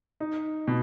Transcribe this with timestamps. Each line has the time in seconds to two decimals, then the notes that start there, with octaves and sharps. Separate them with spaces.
0.20 D#4
0.67 B2